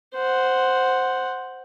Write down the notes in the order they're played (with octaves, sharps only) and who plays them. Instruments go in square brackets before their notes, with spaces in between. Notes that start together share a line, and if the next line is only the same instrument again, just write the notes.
[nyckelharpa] C5 F#5